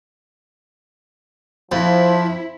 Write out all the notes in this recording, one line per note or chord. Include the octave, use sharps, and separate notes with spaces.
F2 F3 C4 E4